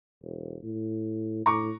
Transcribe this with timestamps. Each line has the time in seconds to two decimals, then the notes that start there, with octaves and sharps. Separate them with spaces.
0.23 E1
0.63 A2
1.46 A2 A#5 C#6 D6